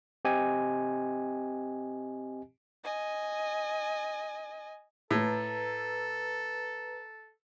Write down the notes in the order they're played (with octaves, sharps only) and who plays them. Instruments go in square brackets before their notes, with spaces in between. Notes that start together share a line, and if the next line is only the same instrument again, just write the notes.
[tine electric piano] C4 G4 D#5 G#5
[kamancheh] D#5 G#5
[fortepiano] A2 [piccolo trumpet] A4 [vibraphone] B4 A#5